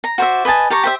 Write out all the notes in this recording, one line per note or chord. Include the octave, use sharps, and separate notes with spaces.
A#5
F#4 C5 D5 E5
B4 D#5 G#5 A5
G4 A5 A#5 C#6
G4 C5 E5